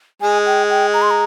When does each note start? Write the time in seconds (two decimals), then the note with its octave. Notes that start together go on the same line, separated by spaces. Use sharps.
0.21 G#3 G#5
0.46 G5
0.70 G5
0.94 A#5
1.02 C6
1.11 A#5